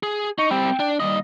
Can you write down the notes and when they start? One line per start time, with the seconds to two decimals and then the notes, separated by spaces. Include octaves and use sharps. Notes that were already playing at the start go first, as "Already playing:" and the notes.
0.03 G#4
0.38 D#4 C#6
0.51 G3 C4 G5
0.80 D4
1.00 D#2 G3 D#5